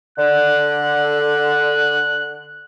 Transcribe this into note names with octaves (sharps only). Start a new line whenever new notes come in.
D3 F#6